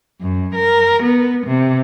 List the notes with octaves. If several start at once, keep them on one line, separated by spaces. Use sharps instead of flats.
F#2
A#4
B3
C3